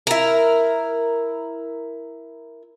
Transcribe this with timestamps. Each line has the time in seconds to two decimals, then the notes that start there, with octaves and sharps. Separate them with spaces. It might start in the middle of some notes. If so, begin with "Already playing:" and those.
0.07 E4 A#4